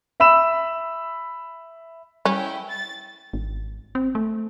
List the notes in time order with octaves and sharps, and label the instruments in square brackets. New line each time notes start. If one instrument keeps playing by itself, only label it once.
[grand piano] E5 B5 E6 E7
[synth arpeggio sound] G3 [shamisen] C#4 [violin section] E4 G5
[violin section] A6
[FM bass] G#1
C4
A3